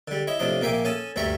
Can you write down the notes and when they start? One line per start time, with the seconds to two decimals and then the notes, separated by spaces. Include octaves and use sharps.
0.08 D3 G3
0.27 E4 C#5 D#5
0.40 A2 C3 F3 D4 D#5
0.62 A#1 A#3 E5 G5 G#5 D6
0.85 C#4 A4 G#5 A5 D#6
1.16 D2 G2 G3 E5 A#5 C#6